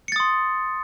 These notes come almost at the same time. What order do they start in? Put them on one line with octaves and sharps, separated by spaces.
C#7 A6 D#6 C6